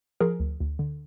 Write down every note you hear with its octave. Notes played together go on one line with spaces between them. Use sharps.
F3 G#4 A#4
D2
D2
D3